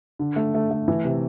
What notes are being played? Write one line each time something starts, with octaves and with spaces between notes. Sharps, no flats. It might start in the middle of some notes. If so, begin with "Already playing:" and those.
D3
A3
A3
A3
E3
C3